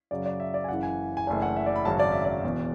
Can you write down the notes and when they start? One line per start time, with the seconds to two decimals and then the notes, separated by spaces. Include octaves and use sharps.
0.11 F#2 C#3 F#3 D5
0.26 D5
0.40 E5
0.54 D5
0.64 G#5
0.69 F#1 F#2 C#3 E3 F#5
0.83 G#5
1.17 G#5
1.27 F#1 F#2 E3 A3 D4 G#5
1.42 F#5
1.56 E5
1.66 D5
1.76 B5
1.85 G#1 F#2 C#3 F#3 A5
2.00 D5
2.12 E5
2.25 D5
2.44 E1 E2 B2